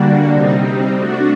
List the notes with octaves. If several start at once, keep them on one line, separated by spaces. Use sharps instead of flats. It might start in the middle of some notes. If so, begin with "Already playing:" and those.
Already playing: D3 G3 A#3 D4 F#4
C3 G3 C4 D#4
A3 D4 F#4